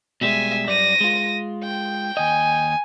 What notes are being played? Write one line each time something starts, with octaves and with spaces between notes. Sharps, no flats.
B2 G3 G#3 E5 G#5
F#2 G3 D5 A#6 D#7
G#3 F4
G5
D#2 D#5 G#5